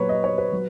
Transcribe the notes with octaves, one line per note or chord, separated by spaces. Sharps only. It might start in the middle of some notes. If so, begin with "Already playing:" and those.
Already playing: A#2 F#3 B4 C#5
D#5
C#5
B4
F#3